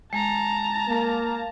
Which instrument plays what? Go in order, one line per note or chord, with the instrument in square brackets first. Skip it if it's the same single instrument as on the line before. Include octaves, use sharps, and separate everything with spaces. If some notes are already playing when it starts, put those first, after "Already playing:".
[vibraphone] G#3 [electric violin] A5 A#5
[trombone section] A#3